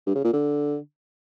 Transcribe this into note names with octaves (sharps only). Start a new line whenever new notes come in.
G2
C#3
A#2
D3